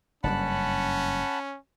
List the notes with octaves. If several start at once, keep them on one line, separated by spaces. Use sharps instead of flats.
F#1 G2 G3 C#4 F#5 A5 B5